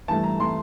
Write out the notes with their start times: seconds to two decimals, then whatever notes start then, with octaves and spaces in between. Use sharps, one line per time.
0.08 G2 E3 A3 A5
0.24 A#5
0.40 E3 A3 C6